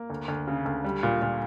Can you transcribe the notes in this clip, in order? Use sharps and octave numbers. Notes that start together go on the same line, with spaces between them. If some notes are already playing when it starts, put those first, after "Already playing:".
Already playing: A#3
D2
D2
C#3
D2
G3
A#2
A#2